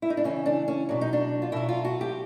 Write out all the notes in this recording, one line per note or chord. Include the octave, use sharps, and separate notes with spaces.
E4
D#4
D4
C#3 E3 C#4
D4
C#4
B2 F#3 D4
D#4
D4
F4
B2 F#3 E4
F4
F#4
G4